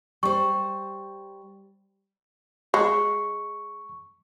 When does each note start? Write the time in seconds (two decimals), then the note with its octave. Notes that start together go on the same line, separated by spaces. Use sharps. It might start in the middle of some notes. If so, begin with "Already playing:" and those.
0.23 G3 C5 C#6
2.74 G#3 C#6